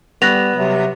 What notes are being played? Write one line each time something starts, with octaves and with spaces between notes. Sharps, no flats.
G3 B3 F#6 A#6 F7
C3 F#3